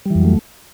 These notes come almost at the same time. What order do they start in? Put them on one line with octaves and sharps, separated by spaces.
G3 E3 F2 F#3 A3